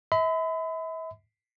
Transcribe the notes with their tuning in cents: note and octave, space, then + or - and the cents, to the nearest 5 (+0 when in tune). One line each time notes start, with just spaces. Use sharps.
E5 -40 B5 +35